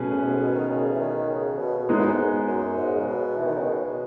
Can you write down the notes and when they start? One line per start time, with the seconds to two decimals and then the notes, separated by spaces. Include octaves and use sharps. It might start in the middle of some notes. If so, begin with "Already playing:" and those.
Already playing: B2 A3 C#4 G#4 B4
0.11 F#2
0.20 A2
0.26 G#2
0.40 B2
0.55 D#3
0.70 C#3
0.92 E3
1.00 D#3
1.30 C#3
1.59 B2
1.79 B2
1.89 A2 G#3 B3 D#4 G#4
1.99 F#2
2.08 G#2
2.48 F#2
2.77 G#2
2.95 C#3
3.07 B2
3.37 E3
3.47 D#3
3.57 C#3
3.66 B2